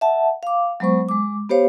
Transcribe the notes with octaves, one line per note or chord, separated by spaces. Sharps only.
E5 F#5 A5
F5 D6
F#3 G#3 B3 C5 C#6
G#3 D6
B3 G4 C5 C#5 F5